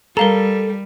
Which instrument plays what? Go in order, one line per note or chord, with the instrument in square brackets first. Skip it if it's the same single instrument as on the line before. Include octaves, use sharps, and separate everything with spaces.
[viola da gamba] G3 [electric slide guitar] A4 [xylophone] A#4 F5 A#5